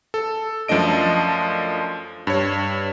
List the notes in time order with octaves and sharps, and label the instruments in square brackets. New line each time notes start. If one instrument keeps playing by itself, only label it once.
[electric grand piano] A4
F#2 F3 A3 D4 D#5 D7
G2 C#5